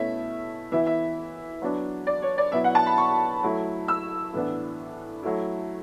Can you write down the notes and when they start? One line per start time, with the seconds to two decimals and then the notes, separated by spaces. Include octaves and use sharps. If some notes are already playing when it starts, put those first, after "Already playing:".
Already playing: B2 A3 C#4 E4 E5
0.72 E3 B3 E4 E5
0.86 E5
1.62 F#3 B3 D4
2.07 D5
2.22 C#5
2.38 D5
2.52 B2 F#3 B3 E4 E5
2.64 F#5
2.75 A5
2.86 B5
2.98 C#6
3.43 F#3 A3 E4
3.88 E6
4.33 A2 E3 B3 D4
5.23 F#3 A3 E4